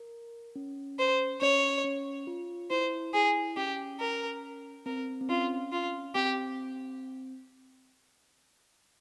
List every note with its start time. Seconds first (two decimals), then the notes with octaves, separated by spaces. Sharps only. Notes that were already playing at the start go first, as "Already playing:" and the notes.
Already playing: A#4
0.56 C#4
0.99 C5
1.41 C#4 C#5
1.84 C#4
2.27 F4
2.70 E4 C5
3.13 E4 G#4
3.57 C#4 G4
4.00 A#4
4.86 C4 A#4
5.21 C4
5.29 C#4 F4
5.72 F4
6.15 C4 G4